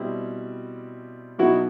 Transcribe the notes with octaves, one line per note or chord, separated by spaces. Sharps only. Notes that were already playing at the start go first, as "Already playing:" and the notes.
Already playing: B2 G3 C4 E4
B2 F#3 B3 D#4 E4 F#4